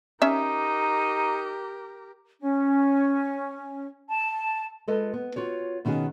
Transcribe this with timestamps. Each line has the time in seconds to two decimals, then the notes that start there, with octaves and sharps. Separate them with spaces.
0.22 C#4 D#4 G4 A#4 E5
2.40 C#4
4.10 A5
4.87 G#3 F4 A4 B4 D#5
5.13 B3
5.36 F4 F#4 C#5
5.85 B2 D#3 C#4 F#4 G#4